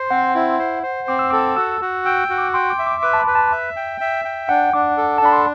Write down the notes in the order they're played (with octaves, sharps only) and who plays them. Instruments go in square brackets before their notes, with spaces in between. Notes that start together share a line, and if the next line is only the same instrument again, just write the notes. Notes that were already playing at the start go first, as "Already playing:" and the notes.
Already playing: [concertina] C5 [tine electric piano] C6
[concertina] C4 [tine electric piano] F#5
[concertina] E4
C5
C5
[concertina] C4 [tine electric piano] D6
[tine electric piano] E6
[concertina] A4 [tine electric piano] D6
[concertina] F#4 [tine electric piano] E6
[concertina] F#4
[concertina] G5 [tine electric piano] E6
[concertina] F#4
[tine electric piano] D6
[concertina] G5 [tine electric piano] C6
[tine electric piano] D6
[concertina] E5
[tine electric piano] D6
[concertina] B4 [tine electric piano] D6
[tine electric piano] A5
B5
[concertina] B4
[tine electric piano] A5
[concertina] E5
G5
E5
G5
[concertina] D4 [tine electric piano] F#5
[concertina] D4 [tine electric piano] D6
[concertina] A4
[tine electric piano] A5
[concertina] D4 [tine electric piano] B5
[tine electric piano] C6